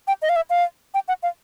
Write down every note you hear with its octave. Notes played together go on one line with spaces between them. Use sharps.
G5
D#5
F5
E5
F5
G5
F#5
F5